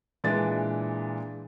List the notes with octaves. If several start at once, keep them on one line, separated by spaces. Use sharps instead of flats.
A#2 E3 G#3 D4 A6